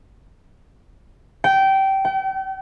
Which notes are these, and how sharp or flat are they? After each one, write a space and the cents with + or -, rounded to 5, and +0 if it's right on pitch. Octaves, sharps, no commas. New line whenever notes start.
G5 -20
G5 -40